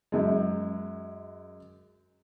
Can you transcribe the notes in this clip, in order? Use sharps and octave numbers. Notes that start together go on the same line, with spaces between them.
F#2 G#3